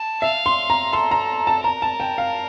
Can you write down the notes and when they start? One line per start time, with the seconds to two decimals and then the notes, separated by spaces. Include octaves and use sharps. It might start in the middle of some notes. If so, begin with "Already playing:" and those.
Already playing: A5
0.22 E5 F5
0.46 C6
0.70 A#5
0.93 A4 C6
1.11 A#5
1.47 A5
1.64 A#4 A#5
1.82 A5
2.00 G5
2.18 F5